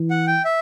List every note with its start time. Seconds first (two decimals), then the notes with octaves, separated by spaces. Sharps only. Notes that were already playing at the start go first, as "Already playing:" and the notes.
Already playing: E3
0.10 F#5
0.27 G5
0.45 E5